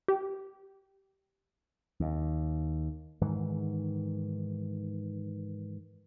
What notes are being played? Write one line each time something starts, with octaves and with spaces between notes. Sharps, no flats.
G4
D#2
G#2 D#3 E3